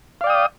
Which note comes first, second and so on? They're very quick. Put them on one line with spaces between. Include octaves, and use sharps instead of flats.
F5 D5 G5 D#6